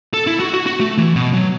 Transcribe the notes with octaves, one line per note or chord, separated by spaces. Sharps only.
A4
E4
F#4
F#4
F#4
A3
E3
B2
F#3